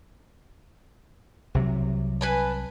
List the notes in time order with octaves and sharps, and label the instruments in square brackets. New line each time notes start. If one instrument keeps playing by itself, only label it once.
[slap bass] C2 C3 F#3
[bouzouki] B4 G#5 A5